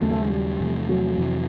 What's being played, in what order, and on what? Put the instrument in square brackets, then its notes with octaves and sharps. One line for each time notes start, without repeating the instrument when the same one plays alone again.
[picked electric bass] D#2 C#3 F#3 [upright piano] A3
[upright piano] A3
G#3
G3
[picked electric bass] E2 C3 F3 A3
[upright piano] F#3
[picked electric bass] F2 C3 E3